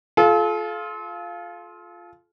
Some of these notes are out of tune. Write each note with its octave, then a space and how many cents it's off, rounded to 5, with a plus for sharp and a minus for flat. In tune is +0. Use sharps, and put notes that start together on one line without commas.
F4 +0 A4 -40